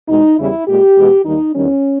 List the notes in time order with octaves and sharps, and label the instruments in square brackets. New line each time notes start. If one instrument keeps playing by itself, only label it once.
[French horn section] E2 B2 G#3 D#4
E2 C#3 G3 E4
A#2 G#3 G4
E2 B2 G#3
D#2 D#3 G3 D#4
E2 D#3 G3 C#4